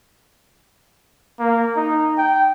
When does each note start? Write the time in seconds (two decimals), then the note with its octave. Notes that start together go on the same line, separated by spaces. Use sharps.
1.40 A#3
1.76 D#4
2.18 G5